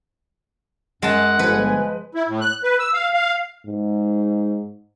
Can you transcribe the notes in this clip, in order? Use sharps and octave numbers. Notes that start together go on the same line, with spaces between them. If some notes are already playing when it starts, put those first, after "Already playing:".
F#2 G#3 F#5 A5
G1 F3 G#3 B4 G#5
E4
A2
F#6
B4
E6
F5
F5
G#2